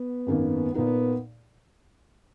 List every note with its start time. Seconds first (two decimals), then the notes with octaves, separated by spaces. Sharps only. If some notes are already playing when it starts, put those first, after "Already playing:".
Already playing: B3
0.27 G#1 F#2 D#3 A#3
0.74 A#2 A#3 B3 D#4 A#4